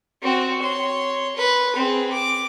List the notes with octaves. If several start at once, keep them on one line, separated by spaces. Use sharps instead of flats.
C4 F#4
C#5 C6
B4
C4 G#4
D6